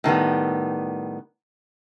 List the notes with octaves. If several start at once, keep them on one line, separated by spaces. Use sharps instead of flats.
A2 D#3 G3 B3